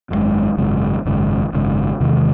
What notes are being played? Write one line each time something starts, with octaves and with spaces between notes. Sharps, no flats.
G#1 F#2 C#3 G#3
G#1 F#2 C#3 G#3
G#1 F#2 C#3 G#3
G#1 F#2 C#3 G#3
E2 C3 D#3 G#3